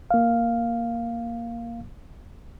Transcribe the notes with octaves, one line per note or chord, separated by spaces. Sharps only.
A#3 F5